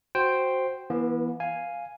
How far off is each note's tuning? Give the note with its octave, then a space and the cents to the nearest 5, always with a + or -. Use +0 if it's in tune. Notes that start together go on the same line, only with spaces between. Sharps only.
F#4 +5 C5 +0 G5 +5
E3 +0 B3 -40
F5 +0 G#5 +0